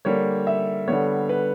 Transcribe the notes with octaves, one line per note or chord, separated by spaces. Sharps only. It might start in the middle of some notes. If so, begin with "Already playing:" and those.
D3 G3 A#3 C#5
E5
D3 G3 B3 C#5
B4